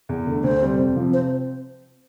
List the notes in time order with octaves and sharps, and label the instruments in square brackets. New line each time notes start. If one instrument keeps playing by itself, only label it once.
[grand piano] E2
D3 A3
[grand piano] D2 [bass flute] C5
[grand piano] C3 G3
F2
C3 F3 C4
[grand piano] C3 [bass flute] C5